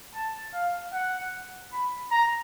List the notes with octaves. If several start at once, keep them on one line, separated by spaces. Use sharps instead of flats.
A5
F5
F#5
B5
A#5